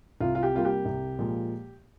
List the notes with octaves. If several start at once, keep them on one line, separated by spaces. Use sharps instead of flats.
C2 F4
F4
G4
C3 G3 A#3 F4
G4
C2
A#2 F3 G#3